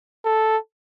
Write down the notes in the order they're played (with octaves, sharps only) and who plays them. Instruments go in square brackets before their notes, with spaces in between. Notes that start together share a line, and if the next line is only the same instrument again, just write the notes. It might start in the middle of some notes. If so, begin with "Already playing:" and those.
[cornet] A4